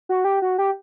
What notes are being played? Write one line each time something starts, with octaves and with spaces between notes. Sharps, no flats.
F#4
G4
F#4
G4